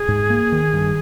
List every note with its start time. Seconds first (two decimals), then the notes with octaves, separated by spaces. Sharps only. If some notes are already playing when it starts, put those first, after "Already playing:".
Already playing: G#4
0.08 G#2
0.30 A#3
0.52 D#3
0.73 G2